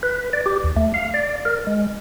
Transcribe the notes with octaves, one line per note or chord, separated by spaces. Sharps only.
B4
D5
G4
D#2
A3
F5
D5
A#4
G#3